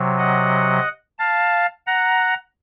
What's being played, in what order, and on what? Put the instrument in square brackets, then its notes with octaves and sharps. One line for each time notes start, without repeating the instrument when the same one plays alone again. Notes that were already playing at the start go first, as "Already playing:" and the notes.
Already playing: [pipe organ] C3 F#3
D#5 F#5
F5 A5
F#5 A#5